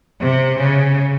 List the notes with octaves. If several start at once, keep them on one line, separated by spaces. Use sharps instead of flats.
C3
C#3